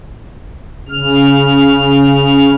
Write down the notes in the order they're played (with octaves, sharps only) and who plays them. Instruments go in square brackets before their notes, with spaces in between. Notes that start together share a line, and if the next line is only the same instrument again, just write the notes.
[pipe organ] C#3 F6